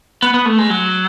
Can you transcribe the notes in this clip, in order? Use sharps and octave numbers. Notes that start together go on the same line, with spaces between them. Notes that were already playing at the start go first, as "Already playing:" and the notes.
B3
B3
A3
G#3
F#3